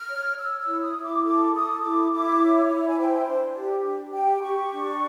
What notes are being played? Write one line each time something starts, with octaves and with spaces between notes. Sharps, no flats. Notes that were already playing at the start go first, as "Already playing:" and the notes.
Already playing: F6
C#5
C#5 E6
E6
E4
D#6
E4
D6
A4 D6
A4 D#6
E4 D6
E4 D6
C#5
E4
G#5
C5 G5
D4
G4
D4
G4 G5
G4 C#6
D4